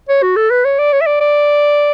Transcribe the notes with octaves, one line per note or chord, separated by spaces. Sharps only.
C#5
F#4
A4
B4
C#5
D5
C#5
E5
D5
D5